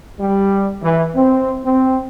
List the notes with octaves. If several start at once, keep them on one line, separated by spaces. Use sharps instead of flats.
G3
E3
C4
C4